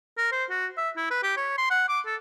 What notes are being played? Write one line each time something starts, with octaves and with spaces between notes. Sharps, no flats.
A#4
C5
F#4
E5
E4
B4
G4
C#5
C6
F#5
D6
A4